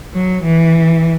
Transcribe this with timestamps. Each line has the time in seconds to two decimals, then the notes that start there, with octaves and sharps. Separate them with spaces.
0.15 F#3
0.44 E3